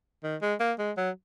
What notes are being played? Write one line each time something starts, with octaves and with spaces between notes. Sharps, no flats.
D#3
G#3
A#3
G#3
F#3